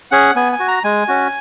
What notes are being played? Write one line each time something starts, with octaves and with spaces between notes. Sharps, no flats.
C#4 G#4 F#5
B3 G#5
G#5
F#4
A#5
G#3 G#5
C#4 F#4